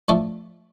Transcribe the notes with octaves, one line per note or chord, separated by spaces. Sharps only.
A2 F3 A3 D4 A4